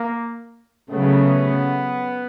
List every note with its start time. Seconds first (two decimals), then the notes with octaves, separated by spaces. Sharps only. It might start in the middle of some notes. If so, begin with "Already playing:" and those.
Already playing: A#3
0.90 C#3 F#3 A3 B3